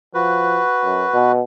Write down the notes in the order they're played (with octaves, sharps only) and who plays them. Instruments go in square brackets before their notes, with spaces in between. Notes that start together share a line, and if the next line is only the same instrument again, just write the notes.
[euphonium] F3 [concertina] F#4 B4
[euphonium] F#2
B2